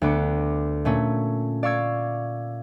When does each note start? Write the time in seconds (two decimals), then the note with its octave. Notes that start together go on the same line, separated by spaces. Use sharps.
0.02 D2 B3 D6 C#7
0.85 A#2 A3 C#4
1.63 D5 F5 C#6 E6 G#6